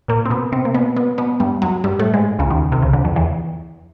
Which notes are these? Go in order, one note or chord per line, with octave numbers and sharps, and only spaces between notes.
A#2 A#3
C4
B2 B3
C3 C4
A#3
B2 B3
B2 B3
B2 B3
G2 G3
F#2 F#3
G2 G3
A2 A3
G#2 G#3
C#2 C#3
D#2 D#3
C2 C3
C#2 C#3
D2 D3
F2 F3
E2 E3